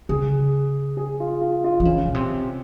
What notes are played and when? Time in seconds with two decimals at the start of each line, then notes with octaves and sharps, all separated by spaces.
0.09 C#3 G#4
0.97 G#4
1.20 F4
1.41 F4
1.64 F4
1.80 F3
1.85 E3 C#4
2.05 A#2
2.14 C3